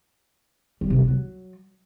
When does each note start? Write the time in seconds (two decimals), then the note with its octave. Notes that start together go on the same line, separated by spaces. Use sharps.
0.81 G3
0.90 C3
0.99 F3
1.08 F#3